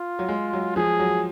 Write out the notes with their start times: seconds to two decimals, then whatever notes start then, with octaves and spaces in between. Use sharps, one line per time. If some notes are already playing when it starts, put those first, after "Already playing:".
Already playing: F4
0.19 F#3
0.28 G#3
0.53 F#3
0.76 F3 G#4
0.99 F#3